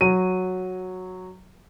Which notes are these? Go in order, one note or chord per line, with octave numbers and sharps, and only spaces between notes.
F#3 D#7